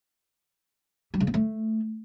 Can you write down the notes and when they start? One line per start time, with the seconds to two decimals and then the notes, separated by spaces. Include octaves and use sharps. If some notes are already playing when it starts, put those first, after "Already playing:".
1.14 G3
1.20 C#3
1.27 B3
1.34 A3